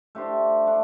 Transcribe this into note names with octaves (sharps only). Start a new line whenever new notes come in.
A3 D4 G4 C5
A3 D4